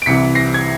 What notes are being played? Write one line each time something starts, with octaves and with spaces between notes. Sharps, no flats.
D7
C2 C3 E3 B6 C#7
A#6 C7
G#6